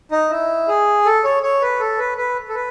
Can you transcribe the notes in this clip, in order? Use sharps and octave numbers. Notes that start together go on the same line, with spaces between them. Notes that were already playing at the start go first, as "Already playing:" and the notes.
D#4
E4
G#4
A4
C#5
C#5
B4
A4
B4
B4
A4
B4